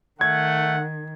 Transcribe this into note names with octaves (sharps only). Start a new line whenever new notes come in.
D#3 A3 F#5 G#6